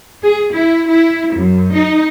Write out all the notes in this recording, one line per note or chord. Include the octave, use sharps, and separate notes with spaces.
G#4
E4
E4
F#2
D#4